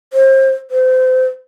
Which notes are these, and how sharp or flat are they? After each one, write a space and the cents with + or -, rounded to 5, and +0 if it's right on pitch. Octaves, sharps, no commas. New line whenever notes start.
C5 +35
C5 -30